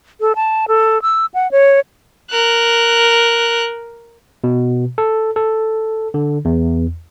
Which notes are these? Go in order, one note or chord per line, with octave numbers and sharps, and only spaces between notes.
A4
A5
A4
E6
F#5
C#5
A#4 F#6
B2
A4
A4
D3
E2